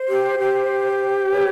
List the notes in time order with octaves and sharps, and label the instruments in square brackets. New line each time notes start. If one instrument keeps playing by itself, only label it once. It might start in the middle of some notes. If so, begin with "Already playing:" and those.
Already playing: [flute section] C5
[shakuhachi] G4
G4
[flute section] B4 C#5